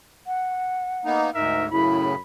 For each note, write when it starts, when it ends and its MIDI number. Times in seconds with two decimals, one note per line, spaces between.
0.27 1.18 78
1.05 1.30 58
1.05 1.30 59
1.05 1.30 63
1.35 1.69 38
1.35 1.69 44
1.35 1.65 63
1.35 1.65 70
1.35 1.65 76
1.71 2.20 42
1.71 2.15 45
1.71 2.15 49
1.71 2.03 64
1.71 2.20 83